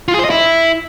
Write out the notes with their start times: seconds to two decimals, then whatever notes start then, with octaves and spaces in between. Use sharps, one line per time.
0.08 F4
0.14 G#4
0.19 C5
0.25 D#5
0.30 E4